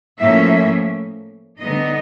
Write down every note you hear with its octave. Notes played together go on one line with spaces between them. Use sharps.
A2 F3 A#3 C#4 E5
D3 G3 B3 D#4 D#5